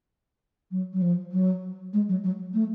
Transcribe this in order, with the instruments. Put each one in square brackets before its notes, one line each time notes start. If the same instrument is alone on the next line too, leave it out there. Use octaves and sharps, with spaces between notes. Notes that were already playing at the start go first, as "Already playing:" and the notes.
[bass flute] F#3
F#3
F3
F#3
G#3
F#3
F#3
A3